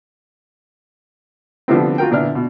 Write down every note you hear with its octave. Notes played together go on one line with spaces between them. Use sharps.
D3 F3 G3 A3 B3 C4
F4 F#4 A#4 G5
A#2 D3 B3 D4 E4 F6
B2